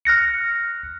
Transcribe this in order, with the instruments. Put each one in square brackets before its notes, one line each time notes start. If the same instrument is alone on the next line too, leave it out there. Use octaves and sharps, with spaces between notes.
[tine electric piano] F6 F#6 A#6 C#7